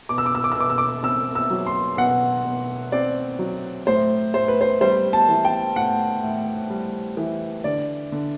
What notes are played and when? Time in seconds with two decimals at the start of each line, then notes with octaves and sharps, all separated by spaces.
0.09 B2 D6
0.18 E6
0.26 D6
0.35 E6
0.44 D6
0.52 E6
0.56 B2 D6
0.70 E6
0.78 D6
1.03 C4 E6
1.35 E6
1.50 F#3
1.66 C6
1.97 B2 F#5
2.45 B2
2.92 C4 D5
3.39 F#3
3.87 A2 C5
4.34 A2 C5
4.48 B4
4.61 C5
4.81 G3 C5
5.13 A5
5.29 E3
5.45 G5
5.76 A2 F#5
6.24 A2
6.70 G3
7.17 E3
7.64 D3 D5
8.12 D3